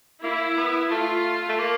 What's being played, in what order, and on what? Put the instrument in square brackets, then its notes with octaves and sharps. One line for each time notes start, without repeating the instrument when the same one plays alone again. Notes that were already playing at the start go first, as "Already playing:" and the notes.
[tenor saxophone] A#3 [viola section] E4
[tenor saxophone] B3
[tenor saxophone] A3 [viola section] F4
[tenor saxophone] A3
A#3